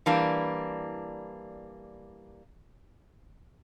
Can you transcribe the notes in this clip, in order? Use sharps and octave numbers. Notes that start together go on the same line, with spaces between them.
E3 G3 A#3 D4